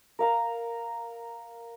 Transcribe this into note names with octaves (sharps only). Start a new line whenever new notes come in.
A#4 F5 A#5